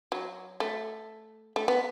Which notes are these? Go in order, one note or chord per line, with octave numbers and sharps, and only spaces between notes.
F#3
A3
A3
B3